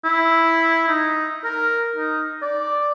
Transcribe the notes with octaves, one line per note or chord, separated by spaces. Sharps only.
E4
D#4
A#4
D#4
D5